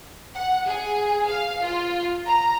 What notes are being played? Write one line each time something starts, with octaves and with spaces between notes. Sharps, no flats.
F#5
G#4
F5
F4
A#5